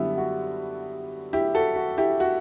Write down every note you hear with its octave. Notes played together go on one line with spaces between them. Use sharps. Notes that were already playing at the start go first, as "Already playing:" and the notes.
Already playing: F#2 D3 G3 B3 E4
F#4
E4 G4
F#4 A4
F#4
E4 G4
F#4